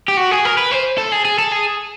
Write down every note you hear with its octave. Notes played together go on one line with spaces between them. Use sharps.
G4
F#4
G#4
A#4
B4
C5
A4
G#4
G#4
A4
G#4